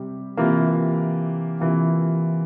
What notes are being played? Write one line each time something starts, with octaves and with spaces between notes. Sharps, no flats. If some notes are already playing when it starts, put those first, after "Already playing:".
Already playing: C3 G3
C3 E3 A#3 F4
C3 E3 A#3 F4